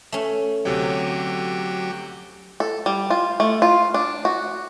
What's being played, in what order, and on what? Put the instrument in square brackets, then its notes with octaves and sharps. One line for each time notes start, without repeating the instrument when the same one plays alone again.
[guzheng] A3 C#4
[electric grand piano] D2 C3 C#5 [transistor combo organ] F#3 G4
[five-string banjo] A4
G3
F4
A3
F4
D4
F#4